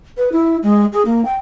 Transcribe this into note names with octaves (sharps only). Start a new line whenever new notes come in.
B4
E4
G#3
G#4
A#3
G5